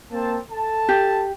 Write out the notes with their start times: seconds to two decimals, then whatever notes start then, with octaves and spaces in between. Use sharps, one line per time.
0.12 A#3 C4 A5
0.51 A4 A5
0.89 G4